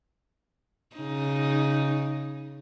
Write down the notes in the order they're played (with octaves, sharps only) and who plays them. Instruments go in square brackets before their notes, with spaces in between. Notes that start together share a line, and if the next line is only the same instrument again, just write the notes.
[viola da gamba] C#3 D#4